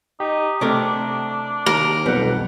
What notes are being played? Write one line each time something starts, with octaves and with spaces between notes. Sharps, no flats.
D#4 G4
C3 A3 D4 A#4 D6
D#2 A#4
B1 F2 G3 B3 F#5